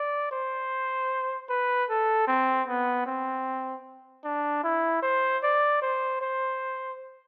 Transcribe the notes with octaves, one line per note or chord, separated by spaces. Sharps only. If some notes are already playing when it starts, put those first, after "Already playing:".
Already playing: D5
C5
B4
A4
C4
B3
C4
D4
E4
C5
D5
C5
C5